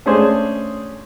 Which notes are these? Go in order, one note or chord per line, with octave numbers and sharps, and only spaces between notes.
A3 C#4 D4 G#4 C5